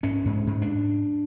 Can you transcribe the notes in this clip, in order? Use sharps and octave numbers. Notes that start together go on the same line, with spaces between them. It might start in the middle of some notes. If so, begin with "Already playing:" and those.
G#2 C#4
G#2
G#2
D4